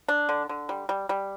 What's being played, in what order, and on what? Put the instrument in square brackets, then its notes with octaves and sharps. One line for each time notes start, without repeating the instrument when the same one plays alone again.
[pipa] D4
D3
D3
G3
G3
G3